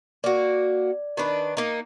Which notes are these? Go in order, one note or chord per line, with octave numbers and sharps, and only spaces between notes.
A#3 F#4 D5
D#3 D4 B4
A#3 D#4